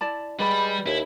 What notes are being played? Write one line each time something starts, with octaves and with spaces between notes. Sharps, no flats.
E4 D5 A5
G3 G#3 B4 D5 B5
D#2 E4